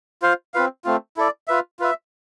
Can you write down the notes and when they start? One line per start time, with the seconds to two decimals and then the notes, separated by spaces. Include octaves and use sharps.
0.22 F4 C5 F5
0.54 C4 F4 B4 F5
0.85 A3 C4 F4
1.17 E4 A4 D5
1.48 F4 B4 E5
1.79 F4 B4 E5